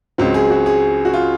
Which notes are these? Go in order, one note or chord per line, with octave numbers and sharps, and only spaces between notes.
C#2 C#3 F#3 C4
G#4
F#4
G#4
F#4
F4